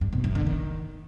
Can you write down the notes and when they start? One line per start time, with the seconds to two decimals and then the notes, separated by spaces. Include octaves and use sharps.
0.01 G2
0.13 B2
0.24 F#2
0.35 D3
0.47 D#3